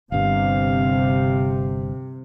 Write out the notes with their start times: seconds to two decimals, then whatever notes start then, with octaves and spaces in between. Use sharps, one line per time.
0.12 G1 G2 C3 F5